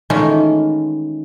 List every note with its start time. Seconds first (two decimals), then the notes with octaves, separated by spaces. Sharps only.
0.10 D#3 E3 G#3 A3 C#4 F4